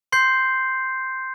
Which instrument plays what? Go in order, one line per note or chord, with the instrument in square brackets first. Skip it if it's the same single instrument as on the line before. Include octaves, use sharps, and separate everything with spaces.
[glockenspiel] C6 G6 C7